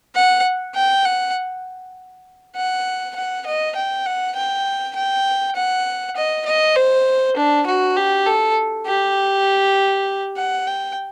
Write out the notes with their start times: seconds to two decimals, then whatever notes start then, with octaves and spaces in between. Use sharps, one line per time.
0.15 F#5
0.75 G5
1.05 F#5
2.56 F#5
3.15 F#5
3.46 D#5
3.75 G5
4.06 F#5
4.36 G5
4.95 G5
5.55 F#5
6.16 D#5
6.46 D#5
6.76 C5
7.36 D4
7.66 F#4
7.96 G4
8.26 A4
8.86 G4
10.37 F#5
10.67 G5